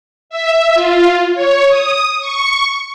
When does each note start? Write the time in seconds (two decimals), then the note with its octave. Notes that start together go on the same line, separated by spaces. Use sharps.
0.30 E5
0.74 F4
1.35 C#5
1.68 D#6
2.20 C#6